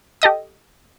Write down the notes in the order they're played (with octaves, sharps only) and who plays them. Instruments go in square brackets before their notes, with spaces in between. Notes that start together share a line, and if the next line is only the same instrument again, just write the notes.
[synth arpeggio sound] G4 A4 D#5 D#6